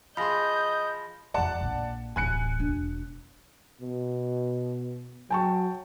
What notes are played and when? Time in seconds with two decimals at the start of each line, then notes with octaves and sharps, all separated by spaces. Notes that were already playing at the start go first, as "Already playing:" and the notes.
0.17 F3 G#4 D#5 B5 C6 G6 A#6
1.34 C2 F2 D5 F#5 A5
1.61 A#1 A#3
2.16 D1 A1 G#5 F#6 C#7
2.60 E1 D4
3.81 B2
5.30 F#3 G5 A5 C#6